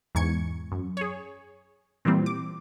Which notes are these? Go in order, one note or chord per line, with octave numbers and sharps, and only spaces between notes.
E2 G#2 C#6 G#6 C#7
F#2
G#4 C#5
A#2 E3 G3 C4
D6